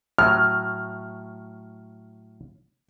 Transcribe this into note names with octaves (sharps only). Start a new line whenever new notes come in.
A2 F#3 F6